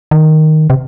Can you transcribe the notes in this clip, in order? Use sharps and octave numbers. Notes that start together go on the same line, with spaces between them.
D#3
C3